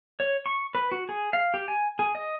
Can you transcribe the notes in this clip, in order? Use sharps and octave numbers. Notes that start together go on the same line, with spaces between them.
C#5
C#6
B4
F#4
G#4
F5
G4
G#5
G#4
D#5